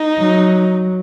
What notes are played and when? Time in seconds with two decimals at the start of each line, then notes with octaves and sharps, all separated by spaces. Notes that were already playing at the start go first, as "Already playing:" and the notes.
Already playing: D#4
0.19 F#3